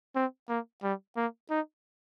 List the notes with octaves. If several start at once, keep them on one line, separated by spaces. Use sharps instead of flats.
C4
A#3
G3
A#3
D#4